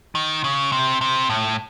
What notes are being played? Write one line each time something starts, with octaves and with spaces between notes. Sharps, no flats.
D#3
C#3
C3
C3
A2